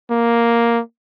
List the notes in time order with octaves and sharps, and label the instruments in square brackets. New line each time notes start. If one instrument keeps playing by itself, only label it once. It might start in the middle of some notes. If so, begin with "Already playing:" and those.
[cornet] A#3